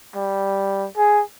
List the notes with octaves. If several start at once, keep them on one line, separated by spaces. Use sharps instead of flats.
G3
G#4